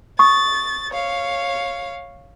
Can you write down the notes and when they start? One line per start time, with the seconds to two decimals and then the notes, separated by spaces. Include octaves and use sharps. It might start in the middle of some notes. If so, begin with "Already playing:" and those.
0.19 C#6 D#6 A6
0.91 C#5 F5